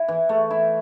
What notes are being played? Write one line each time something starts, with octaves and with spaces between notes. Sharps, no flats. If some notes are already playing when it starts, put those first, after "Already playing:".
Already playing: E4
E3
A3
E4